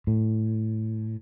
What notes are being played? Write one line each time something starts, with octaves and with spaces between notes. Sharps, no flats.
A2